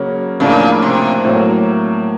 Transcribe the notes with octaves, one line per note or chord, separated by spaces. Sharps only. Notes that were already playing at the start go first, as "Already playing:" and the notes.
Already playing: C#3 F#3 A#3 C#4
A2 C#3 F3 A#3 D4
C3
A2 F#3 A#3